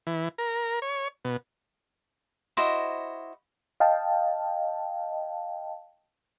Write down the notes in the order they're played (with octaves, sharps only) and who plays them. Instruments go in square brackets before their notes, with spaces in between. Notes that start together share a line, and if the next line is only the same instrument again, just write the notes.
[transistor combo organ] E3
A#4
C#5
B2
[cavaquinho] E4 F#4 C5 D#5
[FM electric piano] D#5 F5 G5 A5